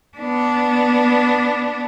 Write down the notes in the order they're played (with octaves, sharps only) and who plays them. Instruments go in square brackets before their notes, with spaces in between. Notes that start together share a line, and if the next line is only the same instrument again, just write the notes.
[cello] B3 D4